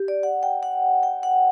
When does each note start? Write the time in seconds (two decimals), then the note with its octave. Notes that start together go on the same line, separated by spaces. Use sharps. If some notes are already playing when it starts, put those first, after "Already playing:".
Already playing: G4
0.08 D5
0.23 F#5
0.43 G5
0.63 F#5
1.03 G5
1.23 F#5